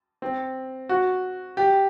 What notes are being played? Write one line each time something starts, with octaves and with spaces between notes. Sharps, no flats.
C4
F#4
G4